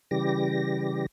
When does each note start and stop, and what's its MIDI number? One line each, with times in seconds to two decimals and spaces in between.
0.11 1.06 49
0.11 1.06 52
0.11 1.06 55
0.11 1.06 67
0.11 1.06 94